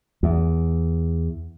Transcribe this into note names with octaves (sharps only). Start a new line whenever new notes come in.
E2